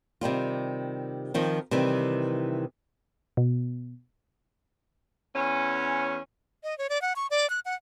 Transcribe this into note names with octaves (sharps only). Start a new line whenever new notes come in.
C3 D#3 G3 F4
D#3 F3 C4
C3 D#3 E3 G3
B2
E2 C#4
D#5
C#5
D5
F#5
C#6
D5
F#6
F#5